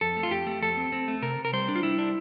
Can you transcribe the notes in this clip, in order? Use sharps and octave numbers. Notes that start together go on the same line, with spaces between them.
F2 A4
A3
F4
F2 G4
A3
F2 A4
C4
C4
A3
C3 A#4
C3
A#4
G3 C5
D4
F4
G3 E4
D4